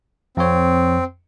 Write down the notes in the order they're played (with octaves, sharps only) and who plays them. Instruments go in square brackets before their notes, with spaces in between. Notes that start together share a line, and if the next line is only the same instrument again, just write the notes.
[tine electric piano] F2 C#5 [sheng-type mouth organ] C4